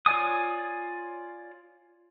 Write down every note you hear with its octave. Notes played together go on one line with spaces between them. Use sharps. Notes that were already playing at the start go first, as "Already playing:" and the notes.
F4 C#5 D5 G#5 D#6